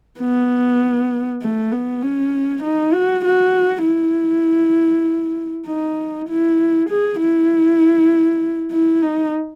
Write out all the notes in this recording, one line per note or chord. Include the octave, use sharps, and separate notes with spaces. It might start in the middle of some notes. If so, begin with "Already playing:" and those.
B3
A3
B3
C#4
D#4
F#4
F#4
E4
D#4
E4
G#4
E4
E4
D#4